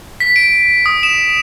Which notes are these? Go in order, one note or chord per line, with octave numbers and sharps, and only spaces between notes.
B6
D7
D#6
E7